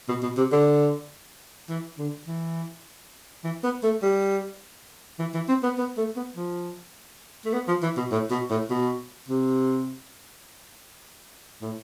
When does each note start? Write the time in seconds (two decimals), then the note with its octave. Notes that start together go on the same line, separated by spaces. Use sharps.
0.09 B2
0.23 B2
0.38 C3
0.52 D3
1.69 E3
1.98 D3
2.27 E3
3.44 E3
3.64 B3
3.83 A3
4.02 G3
5.19 E3
5.34 E3
5.48 C4
5.63 B3
5.78 B3
5.98 A3
6.16 B3
6.37 F3
7.45 A3
7.53 B3
7.68 F3
7.83 E3
7.97 B2
8.12 A2
8.31 B2
8.51 A2
8.70 B2
9.29 C3
11.62 A2